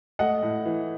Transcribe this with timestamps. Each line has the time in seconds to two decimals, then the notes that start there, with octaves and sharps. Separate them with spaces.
0.19 A3 D#5 F#5
0.43 A2
0.65 E3